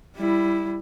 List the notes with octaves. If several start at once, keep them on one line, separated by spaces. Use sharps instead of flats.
G3 E4